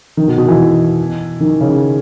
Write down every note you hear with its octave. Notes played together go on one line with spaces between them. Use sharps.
D#3
B2
B2
E3
D#3
C#3